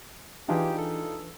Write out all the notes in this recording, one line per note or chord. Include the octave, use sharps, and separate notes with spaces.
E3 D4 D#4 F4 G4 G#4
A4